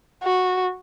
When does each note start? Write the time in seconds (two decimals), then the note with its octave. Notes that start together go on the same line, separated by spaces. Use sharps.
0.23 F#4